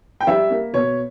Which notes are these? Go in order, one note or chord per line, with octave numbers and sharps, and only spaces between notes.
G5
G3 E5
A#3
B2 C#5